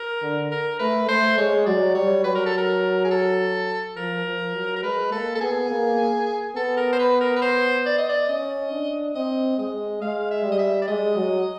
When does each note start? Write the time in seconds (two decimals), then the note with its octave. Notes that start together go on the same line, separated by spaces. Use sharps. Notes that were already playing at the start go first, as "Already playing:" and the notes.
Already playing: A#4
0.22 D3
0.51 A#4
0.79 A3 B4
1.08 A3 C5
1.38 G#3 C#5
1.66 F#3 D5
1.95 G3 C#5
2.24 F#3 B4
2.35 A#4
2.46 A4
2.58 A#4
3.05 G#4
3.11 A4
3.96 F3 A#4
4.26 F3
4.54 F#3
4.76 A#4
4.83 G#3 B4
5.12 A#3 A4
5.35 A4
5.41 B3 G#4
5.69 A#3
6.56 B3 A4
6.77 A#4
6.92 C5
6.99 B4
7.21 A#4
7.36 B4
7.42 C5
7.86 D5
7.98 D#5
8.09 D5
8.29 C#4 D#5
8.72 D4
9.15 C4 D#5
9.58 G#3 D#5
10.01 G#3 F5
10.31 E5
10.44 G3
10.52 D#5
10.59 E5
10.82 D5
10.88 G#3 D#5
11.16 F#3